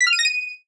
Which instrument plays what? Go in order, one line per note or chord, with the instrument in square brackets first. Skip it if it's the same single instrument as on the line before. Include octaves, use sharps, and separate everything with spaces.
[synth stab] B6
F6
D#7
A#6
D#7